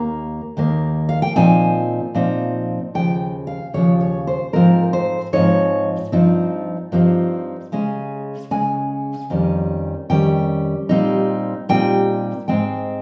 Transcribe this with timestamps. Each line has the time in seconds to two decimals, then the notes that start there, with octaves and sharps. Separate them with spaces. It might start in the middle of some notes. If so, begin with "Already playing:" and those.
Already playing: D#2 D#3 A#3 A#5
0.57 D#2 D#3 A#3
1.09 F5
1.22 G5
1.36 A#2 F3 C4 D#4 G#5
2.15 A#2 F3 C4 D#4
2.95 D#2 C#3 F3 G5
3.47 F5
3.74 D#2 C#3 F3 C#5
4.01 C#5
4.27 C5
4.53 G#2 F3 C4 D#4 A#4
4.93 C5
5.33 G#2 F3 C4 D#4 C#5
6.12 G2 F3 C4 D#4
6.92 G2 F3 C4 D#4
7.72 C#3 G#3 C#4
8.51 C#3 G#3 C#4 G#5
9.30 F2 D#3 G3 C#4
10.10 F2 D#3 G3 C#4 G5
10.89 A#2 G3 C4 D#4
11.69 A#2 G3 C4 D#4 G5
12.48 G#2 D#3 G#3 C4 G5